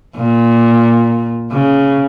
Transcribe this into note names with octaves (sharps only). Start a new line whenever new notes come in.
A#2
C#3